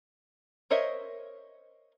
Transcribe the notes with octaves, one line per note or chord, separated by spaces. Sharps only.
A#4 C5 C#5 D#5 E5